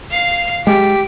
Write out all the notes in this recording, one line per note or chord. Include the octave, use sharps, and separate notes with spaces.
F5 C7
G#3 G4 B6 D7